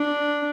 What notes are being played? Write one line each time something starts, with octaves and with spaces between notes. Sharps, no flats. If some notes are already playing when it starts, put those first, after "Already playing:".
Already playing: D4